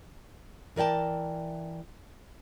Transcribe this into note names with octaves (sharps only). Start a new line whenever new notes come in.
E3 A#4 D5 G5 A5